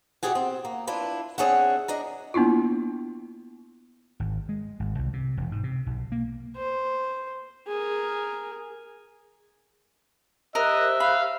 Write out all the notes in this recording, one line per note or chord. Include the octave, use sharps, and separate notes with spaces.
B2 D3 F3 G4 G#4 F#5
C4
A#3
D4 E4 F4 B4
C4 D4 G#4 C#5 E5 F#5
D4 D#5 A#5
A#3 B3 D4 E4 F4
G#1
G#3
G#1
C2
C3
E1
G#2
C3
B1
A#3
C5
G#4 A#4
G4 A#4 C5 D#5 E5 F#6
F5 B5